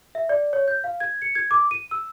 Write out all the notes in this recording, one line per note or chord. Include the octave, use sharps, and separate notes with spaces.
E5
D5
C#5
G6
F5
G#6
C#7
G#6
D6
D#7
E6